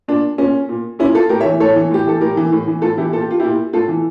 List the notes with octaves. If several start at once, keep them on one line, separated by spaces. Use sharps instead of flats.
A#2 D4
A#2 C#4
A#2
A#2 C#4 E4
F4 A4
A2 G4 A#4
C#5 E5
E3
A2 A4 C#5
E3
A2 G4
E3 A4
A2 G4 A#4
E3
A2
E3
A2 F4 A4
E3 E4 G4
A#2 A4
G4
F4
A#2 E4 G4
A2 F4 A4
E3